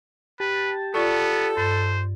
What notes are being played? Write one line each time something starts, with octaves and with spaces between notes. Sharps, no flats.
G4 B4 A5
B3 F4 A4 D5 C#6
G2 C5 A6